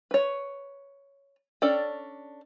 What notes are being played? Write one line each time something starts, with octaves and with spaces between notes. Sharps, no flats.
B4 C#5
C#4 D4 A4 D5 G5